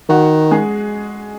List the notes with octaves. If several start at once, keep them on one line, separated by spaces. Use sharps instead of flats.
D#3 F#4 F#5
G#3 G#4